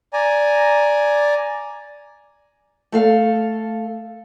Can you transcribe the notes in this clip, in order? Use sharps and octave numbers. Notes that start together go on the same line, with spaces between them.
D5 G#5 A#5
A3 A4 F5